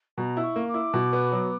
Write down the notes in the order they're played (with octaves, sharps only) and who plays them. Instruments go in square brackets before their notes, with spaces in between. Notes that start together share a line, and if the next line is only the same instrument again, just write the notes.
[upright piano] B2 [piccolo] A#5
[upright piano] E4
[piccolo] C#6
[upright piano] A#3
[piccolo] D6
[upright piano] E4
B2
B3
F#3